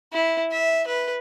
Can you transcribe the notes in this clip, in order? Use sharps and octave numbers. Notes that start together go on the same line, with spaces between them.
E4
E5
B4